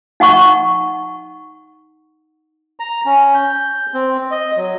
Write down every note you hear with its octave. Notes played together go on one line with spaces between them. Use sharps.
D#4 F#5 A5 C#6
A#5
C#4
G6
C4
D#5
F#3